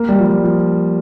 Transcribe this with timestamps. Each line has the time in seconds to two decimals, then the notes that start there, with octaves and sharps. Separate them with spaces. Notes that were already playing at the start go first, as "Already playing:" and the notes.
Already playing: A#3
0.09 G3
0.20 F3
0.26 G3
0.44 F3